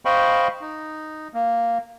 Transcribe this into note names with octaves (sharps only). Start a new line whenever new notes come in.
C5 D#5 F5 G5 B5 C#6
D#4
A#3